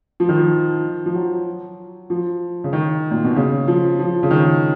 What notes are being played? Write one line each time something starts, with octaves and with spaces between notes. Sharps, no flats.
F3
D#3
F3
F3
F#3
F3
C#3
D#3
A#2
B2
C#3
F3
F3
C#3
D#3